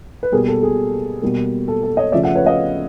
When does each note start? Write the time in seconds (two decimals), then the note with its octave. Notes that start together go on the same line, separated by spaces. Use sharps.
0.23 B4
0.32 B2 G3 A#3 G#4 A#4
0.47 A4
0.63 G#4
1.22 B2 G3 A#3
1.68 A4
1.83 A4
1.97 C#5 D#5
2.12 C#3 F3 A3 D5 E5
2.23 E5 F#5
2.35 B4 C#5
2.46 D#5 F5